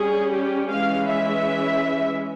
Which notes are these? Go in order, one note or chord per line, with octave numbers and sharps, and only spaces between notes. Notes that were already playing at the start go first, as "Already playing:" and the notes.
Already playing: G3 C#4 G#4
G4
E3 G#3 C#4 F5
E5